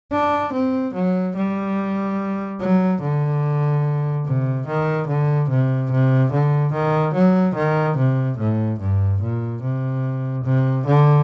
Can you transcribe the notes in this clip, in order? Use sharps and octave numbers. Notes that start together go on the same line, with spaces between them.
D4
C4
F#3
G3
F#3
D3
C3
D#3
D3
C3
C3
D3
D#3
F#3
D#3
C3
A2
G2
A#2
C3
C3
D3